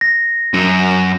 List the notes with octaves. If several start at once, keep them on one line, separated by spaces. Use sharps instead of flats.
A#6
F#2